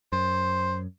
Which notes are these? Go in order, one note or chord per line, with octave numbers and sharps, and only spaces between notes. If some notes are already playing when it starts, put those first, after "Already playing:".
F#2 C5